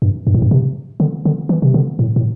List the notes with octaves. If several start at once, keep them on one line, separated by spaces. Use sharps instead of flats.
G2
G2
A2
G2
C3
D3
D3
E3
C3
D3
A2
A2